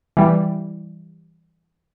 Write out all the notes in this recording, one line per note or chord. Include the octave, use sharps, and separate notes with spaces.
E3 G3